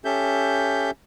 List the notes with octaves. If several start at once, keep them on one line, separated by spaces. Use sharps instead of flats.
C#4 G4 A4 E5 G6